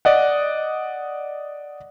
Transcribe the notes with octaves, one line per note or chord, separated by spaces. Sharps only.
D5 D#5 F#5